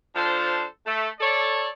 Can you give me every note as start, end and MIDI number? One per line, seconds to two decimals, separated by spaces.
0.16 0.64 53
0.16 0.64 62
0.16 0.64 69
0.16 0.64 72
0.87 1.08 57
1.20 1.67 69
1.20 1.67 73
1.20 1.67 74